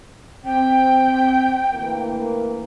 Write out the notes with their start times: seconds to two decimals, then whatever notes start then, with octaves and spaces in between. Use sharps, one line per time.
0.45 C4 G5
1.72 D2 E3 A#3